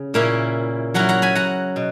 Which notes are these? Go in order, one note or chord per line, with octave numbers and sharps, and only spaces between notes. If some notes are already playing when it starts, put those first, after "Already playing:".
Already playing: C#3
A#2 A#3 C#4 E4
F#3 C#4 E4 F#5 A#5
F#5 A#5
G#5 B5
F#5 A#5
B2